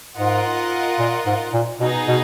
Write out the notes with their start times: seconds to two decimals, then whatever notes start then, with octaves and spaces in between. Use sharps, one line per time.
0.17 G#2 F4 A#4 D#5 F#5
0.99 A#2
1.26 G#2
1.53 A#2
1.80 B2 B3 D#4 G#4
2.08 B2